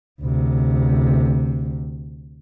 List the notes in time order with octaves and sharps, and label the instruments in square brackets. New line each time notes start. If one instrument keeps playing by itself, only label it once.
[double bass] D2 C3